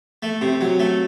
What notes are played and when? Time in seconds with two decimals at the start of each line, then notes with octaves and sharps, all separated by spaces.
0.23 A3
0.41 C3
0.61 F#3
0.79 A3